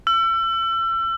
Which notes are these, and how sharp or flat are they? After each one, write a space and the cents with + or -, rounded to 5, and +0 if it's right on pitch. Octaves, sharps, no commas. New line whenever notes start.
E6 +35